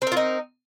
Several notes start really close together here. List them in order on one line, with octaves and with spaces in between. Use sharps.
C4 A#4 F4 D#4